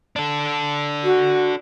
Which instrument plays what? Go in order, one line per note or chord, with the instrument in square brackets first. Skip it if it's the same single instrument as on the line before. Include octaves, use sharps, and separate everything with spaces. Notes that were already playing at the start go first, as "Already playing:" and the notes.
[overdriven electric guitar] D4 A4
[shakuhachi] F#4